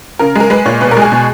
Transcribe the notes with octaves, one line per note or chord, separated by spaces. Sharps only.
C#3 A#4
G#3 A#4
G#3 B4
A#2 C#5
B2 B4
A#4
G#3
G#4
B2